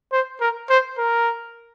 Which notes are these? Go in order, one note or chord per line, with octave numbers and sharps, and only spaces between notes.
C5
A#4
C5
A#4